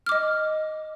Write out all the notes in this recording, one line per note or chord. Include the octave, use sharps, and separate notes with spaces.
D#5 D6 F6